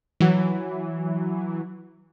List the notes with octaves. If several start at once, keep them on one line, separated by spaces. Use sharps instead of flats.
E3 F#3